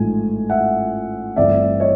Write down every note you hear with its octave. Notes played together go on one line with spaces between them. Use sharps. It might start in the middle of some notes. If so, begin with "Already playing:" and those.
Already playing: A1 G#2 F3 A3 G#5
E5 F#5
G1 G2 E3 A3 C4 D5 E5
C#5 D#5